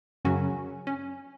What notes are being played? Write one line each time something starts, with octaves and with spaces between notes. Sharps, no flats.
F#2 C#3 F#3 C#4 F#4
C#4